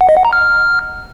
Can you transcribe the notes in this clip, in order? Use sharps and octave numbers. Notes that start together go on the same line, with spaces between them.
F#5
D#5
F#5
A#5
F6